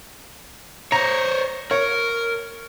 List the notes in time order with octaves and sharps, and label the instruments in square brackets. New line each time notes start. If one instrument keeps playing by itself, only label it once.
[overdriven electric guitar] C5 C#5 [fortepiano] A#5
[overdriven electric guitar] A#4 [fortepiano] C#5